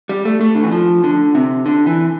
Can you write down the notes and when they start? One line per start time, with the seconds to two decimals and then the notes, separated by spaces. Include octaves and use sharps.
0.09 G3
0.25 A3
0.41 A3
0.55 D3
0.64 E3
0.71 F3
1.04 D3
1.35 C3
1.66 D3
1.87 E3